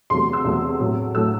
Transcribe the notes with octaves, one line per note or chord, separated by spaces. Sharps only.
E2 C3 F#3 A3 C6
E6
E2 C3 F#3 A3
A2 F#3 A3
A2 F#3 A3 E6